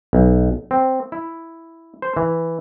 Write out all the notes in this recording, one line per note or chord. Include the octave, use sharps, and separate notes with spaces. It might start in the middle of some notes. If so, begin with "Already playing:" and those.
B1
C4
E4
C5
E3